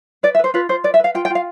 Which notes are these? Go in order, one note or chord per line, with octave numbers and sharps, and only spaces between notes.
B4 D5
E5
B4 C5
F4 B4
F4 C5
B4 D5
E5
B4 F5
F4 G5
G5
F4
F5